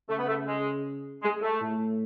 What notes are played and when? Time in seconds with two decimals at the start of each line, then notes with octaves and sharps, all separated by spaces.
0.09 C#3 A3
0.19 B3
0.28 A3
0.47 G#3
1.23 G#3
1.42 A3
1.61 A2